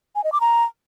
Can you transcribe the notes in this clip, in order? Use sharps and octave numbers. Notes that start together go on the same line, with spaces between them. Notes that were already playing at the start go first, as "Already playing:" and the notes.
G#5
D#5
D6
A#5